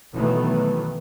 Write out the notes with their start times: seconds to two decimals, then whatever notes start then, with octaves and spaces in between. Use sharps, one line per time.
0.14 B2 D#3 E3 F#3 A3 B3